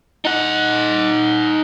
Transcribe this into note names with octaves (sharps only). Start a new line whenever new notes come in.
D#4 F#5